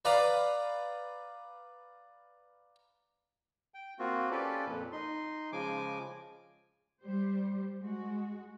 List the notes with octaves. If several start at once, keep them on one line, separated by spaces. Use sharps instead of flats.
B4 D5 F5 A#5
G5
A#3 C4 F4 F#4
C#4 F4 G4 A4 B4 D5
F2 A#2
D#4 C6
C#3 F3 G#3 G#5 D6
G3 C5
G#3 F#4